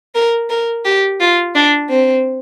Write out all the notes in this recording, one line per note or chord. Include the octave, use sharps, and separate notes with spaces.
A#4
A#4
G4
F4
D4
C4